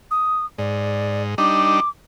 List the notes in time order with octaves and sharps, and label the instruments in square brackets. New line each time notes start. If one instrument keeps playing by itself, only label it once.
[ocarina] D#6
[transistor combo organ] G#2 [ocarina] D5
[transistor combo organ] G3 D4 D#4 [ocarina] D6